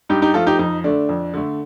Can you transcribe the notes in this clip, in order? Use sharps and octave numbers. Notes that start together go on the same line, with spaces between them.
G2 D#4 G4
D#4 G4
F3 A3 F4 A4
D#4 G4
F2 D#4
D3 A3 D4
F2
D3 A3